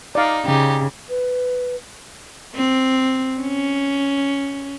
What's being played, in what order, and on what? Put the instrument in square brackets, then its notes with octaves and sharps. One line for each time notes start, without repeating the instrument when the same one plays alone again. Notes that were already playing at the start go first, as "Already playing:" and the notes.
[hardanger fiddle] D#4 [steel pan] D5 F5
[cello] C#3 [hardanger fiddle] D#4 G4
[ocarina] B4
[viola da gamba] C4
C#4